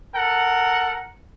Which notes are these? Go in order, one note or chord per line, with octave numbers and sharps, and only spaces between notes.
A4 A#4 F#5